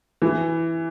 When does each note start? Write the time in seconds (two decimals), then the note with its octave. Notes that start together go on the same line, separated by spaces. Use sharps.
0.22 E3